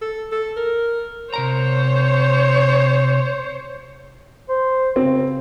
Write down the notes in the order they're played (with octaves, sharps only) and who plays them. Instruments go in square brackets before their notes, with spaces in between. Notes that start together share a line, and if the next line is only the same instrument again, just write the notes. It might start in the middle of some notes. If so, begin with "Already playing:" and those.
[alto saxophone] A4
A4
A#4
[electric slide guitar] C3 A#4 A#5 [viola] C5 C#5
[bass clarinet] C5
[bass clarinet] C#3 [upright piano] C4